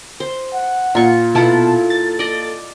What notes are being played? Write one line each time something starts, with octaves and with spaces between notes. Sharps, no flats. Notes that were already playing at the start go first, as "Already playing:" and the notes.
C5
F#5
A#2 F4 C#6
B2 E4 F4 A4 F#5 A5
A6
D5 D#5